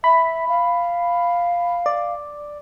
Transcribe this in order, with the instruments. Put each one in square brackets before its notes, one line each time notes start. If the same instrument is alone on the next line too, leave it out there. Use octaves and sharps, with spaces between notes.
[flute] E5 [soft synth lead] B5
[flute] F5
[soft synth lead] D5